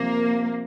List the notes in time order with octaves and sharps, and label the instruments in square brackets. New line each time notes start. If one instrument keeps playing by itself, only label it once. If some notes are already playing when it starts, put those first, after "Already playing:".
Already playing: [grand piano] C3 F3 C4 [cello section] A#3